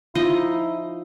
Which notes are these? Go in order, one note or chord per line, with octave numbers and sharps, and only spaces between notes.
F3 D#4 E4 D#5